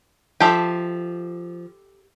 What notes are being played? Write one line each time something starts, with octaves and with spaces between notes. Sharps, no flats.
F3 G4 A4 E5